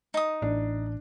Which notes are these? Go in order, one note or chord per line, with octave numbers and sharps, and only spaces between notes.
D#4 D#6
A1 D4